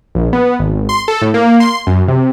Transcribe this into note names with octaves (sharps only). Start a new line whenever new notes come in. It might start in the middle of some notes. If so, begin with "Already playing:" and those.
A#1
B3
G#1
C6
A4
A2
A#3
C6
F#2
C3